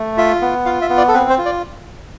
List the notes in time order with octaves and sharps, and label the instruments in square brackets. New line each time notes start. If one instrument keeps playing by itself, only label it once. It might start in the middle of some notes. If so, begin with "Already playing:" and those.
Already playing: [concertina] A3
F4 E5
B3
F4 F5
E5
B3
D5
A4
C4 B4
C5
F4
D5